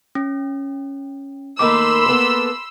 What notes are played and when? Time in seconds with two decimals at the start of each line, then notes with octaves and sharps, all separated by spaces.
0.15 C#4
1.59 D#3 A3 A#3 B5 C6 D6 E6
2.06 A#3 B3 A4